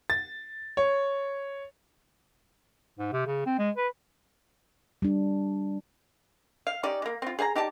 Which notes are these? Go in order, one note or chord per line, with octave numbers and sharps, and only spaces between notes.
A6
C#5
G#2
C3
C#3
C4
G#3
B4
G3 D4
F5
C#4 D#4 G4 D5
G#3 A#3
C4 F4
G#4 F5 G#5 A#5
D#4 G4 D5 A5